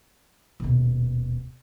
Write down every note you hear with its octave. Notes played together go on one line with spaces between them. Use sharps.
D#1 B2